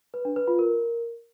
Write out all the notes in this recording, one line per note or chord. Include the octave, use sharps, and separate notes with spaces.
B4
D4
B4
F4
A#4